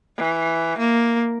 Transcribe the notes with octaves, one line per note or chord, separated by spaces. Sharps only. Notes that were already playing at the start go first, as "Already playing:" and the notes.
E3
A#3